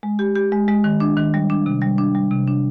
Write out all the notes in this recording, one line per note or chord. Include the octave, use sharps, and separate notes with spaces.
G#3
G4
G4
G#3
G#3
D#3
D4
D#3
G3
D4
C3
G3
D4
G3
C3
D4